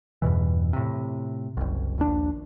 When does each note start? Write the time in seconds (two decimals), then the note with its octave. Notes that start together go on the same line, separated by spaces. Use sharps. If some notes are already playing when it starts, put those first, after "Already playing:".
0.22 E2 G2 B2 E3
0.73 A2 C3
1.57 F#1 C2
1.98 A#1 D#2 D4